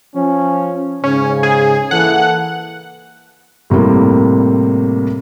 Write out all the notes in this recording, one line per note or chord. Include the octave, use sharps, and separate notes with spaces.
F3 C#4
G#2 C#3 C#4
G#4
E3 A#3 A4 F#5
A2 C3 G3 A#3